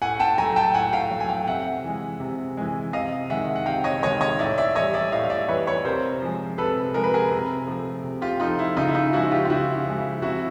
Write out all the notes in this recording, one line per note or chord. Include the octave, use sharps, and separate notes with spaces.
A2 F#5 G#5
G5 A5
F#3 A3 G#5 A#5
G5 A5
A2 F#5 G#5
F5 G5
F#3 A3
G#5
F5 G5
C3 E5 F#5
E3 G#3
C3
E3 G#3
C3 D#5 F5
D#3 G#3 E5 F#5
F#5
C3 F5 G5
C#5 D#5
D#3 G#3 C#5 D#5
C#5 D#5
A2 D5 E5
D5 E5
E3 G3 C#5 D#5
D5 E5
A2 D#5 F5
F5
D5 E5
E3 G3 B4 C#5
B4 C#5
C3 A#4 C5
F3 G#3
C3 A4 B4
F3 G#3 A#4
B4
G#4 A#4
C3
F3 A3
C3
F4 G4
F3 A3 D#4 F4
E4
C#3 D#4 F4
E4
D#4 F4
F3 G#3 E4 F#4
F4 G4
F4
C#3 E4 F#4
F3 G#3
E4
C3 E4 F#4